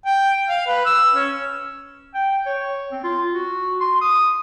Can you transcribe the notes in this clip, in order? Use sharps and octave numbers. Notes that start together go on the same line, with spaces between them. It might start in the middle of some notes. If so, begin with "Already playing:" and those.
G5
F5
B4
E6
C#4
G5
C#5
C4
F4
F#4
C6
D#6